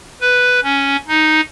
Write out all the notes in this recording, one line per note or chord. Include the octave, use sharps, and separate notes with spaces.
B4
C#4
D#4